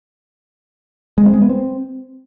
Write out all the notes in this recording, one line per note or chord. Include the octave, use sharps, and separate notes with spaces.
G#3
C4
G#3
B3
C4